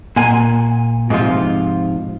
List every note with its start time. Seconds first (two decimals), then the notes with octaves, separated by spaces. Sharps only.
0.16 A#2 F#5 G#5
1.10 G#2 C3 F3 F4